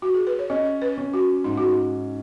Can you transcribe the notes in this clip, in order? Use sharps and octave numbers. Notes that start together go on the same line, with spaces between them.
F#4
G#4
B4
C#5
C#4 D#5
B4
C#4
F#4
G#2 D#4
F#4